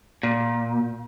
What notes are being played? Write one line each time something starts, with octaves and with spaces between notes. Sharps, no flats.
A#2